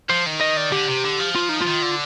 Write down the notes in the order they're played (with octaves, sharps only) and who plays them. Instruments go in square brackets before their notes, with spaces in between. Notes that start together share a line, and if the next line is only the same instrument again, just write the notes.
[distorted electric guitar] F3 [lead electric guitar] C5
[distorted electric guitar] D#3
[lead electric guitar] D#5
D5
[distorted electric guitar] D3 [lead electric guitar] G4
[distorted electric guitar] C3
D3
F3
[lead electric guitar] F4
D#4
F4
[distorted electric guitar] D#3
D3